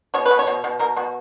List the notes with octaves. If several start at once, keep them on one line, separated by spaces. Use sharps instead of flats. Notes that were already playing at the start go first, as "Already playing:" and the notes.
B2 C#5
B4
B2
C#5
B2
B2
B2 A#4
B2 F#4